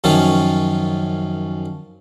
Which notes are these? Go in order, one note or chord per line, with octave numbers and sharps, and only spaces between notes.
F#2 D#3 F3 C#4 F4